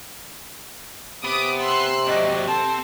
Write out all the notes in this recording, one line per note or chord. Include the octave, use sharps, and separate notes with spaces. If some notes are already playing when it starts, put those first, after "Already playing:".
C3 B3 D6 D#6 D7
C6 E6 F#6
D#2 F#3 D5 D#5
C4 A4 A5